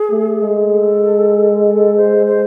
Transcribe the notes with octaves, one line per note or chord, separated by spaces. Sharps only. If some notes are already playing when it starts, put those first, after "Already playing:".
Already playing: G#4
A3
G#3
A4
A4
C5
C5